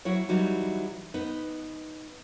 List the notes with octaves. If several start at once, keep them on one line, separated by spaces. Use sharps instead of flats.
F#3 E4 C#5
E3 F#3 G3 D#4
B3 D#4